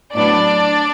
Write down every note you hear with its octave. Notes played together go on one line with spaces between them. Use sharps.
A2 F#3 B3 D4 D5